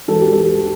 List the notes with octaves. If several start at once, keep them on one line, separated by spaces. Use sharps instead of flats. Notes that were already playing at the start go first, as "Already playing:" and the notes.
E1 A4
G4
E1 A4